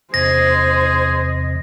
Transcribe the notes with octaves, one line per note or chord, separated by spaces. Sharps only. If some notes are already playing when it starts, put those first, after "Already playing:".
E2 C3 G#4 C5 D#5 A#6